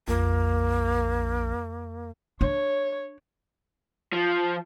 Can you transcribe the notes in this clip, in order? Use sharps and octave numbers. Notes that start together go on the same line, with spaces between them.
A#1 F2 A#3
D4 C#5
F3